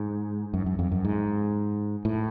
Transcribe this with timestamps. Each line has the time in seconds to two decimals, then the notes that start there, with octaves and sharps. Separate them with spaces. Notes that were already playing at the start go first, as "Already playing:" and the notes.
Already playing: G#2
0.54 F#2
0.66 F#2
0.79 F2
0.92 F#2
1.05 G#2
2.05 A2